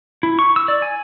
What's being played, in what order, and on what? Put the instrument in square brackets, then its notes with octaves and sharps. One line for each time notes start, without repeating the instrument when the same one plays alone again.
[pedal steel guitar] E4
C#6
E6
D5
G#5